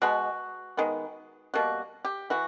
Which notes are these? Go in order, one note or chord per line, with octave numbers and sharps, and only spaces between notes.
B2 G#3 B3 F#4
D#3 G#3 B3
B2 G3 A#3 F#4
G4
E3 F#4